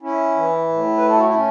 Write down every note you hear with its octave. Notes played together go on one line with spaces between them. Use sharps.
C#4 E4
E3
A2
B4
A3 A4
F#4
E4
C#4